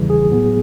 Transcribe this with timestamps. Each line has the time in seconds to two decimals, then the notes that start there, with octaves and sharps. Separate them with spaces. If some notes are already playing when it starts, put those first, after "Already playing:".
Already playing: E2 C#3 E3 G3
0.10 G#4
0.31 A2 F#3 B3